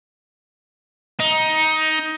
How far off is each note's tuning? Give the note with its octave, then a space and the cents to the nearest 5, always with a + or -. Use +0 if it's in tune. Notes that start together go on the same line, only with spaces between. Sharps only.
D#4 +15